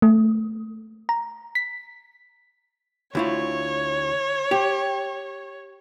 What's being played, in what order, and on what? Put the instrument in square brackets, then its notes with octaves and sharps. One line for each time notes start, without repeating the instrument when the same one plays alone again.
[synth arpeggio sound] A3
A#5
B6
[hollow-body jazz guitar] D2 E4 F4 [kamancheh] C#5
[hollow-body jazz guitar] G4